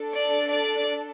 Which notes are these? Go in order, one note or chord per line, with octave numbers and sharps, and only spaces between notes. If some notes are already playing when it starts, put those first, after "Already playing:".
Already playing: D4 A4
D5
D5